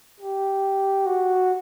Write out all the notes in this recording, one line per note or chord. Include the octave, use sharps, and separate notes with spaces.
G4
F#4